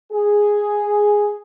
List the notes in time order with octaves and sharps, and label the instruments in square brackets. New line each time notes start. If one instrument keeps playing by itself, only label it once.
[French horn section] G#4